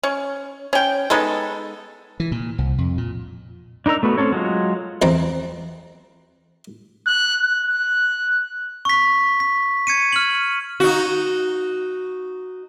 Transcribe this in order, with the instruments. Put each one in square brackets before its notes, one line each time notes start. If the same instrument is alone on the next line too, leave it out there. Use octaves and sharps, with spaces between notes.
[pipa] C#4
C#4 G5
G#3 B3 D#4 A4
[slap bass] E3
A#2
C2
F2
A#2
[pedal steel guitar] D4 D#4 A#4 A#5 E6
A3 B3 F#4
C4 C#4 A4 C#5
F#3 G#3 F4
[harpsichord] E2 C4 A#5
[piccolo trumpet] F#6
F#6
[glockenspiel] C#6 B6
B6
G#6 C#7 D#7
F6 F#7
[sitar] D#4 F#4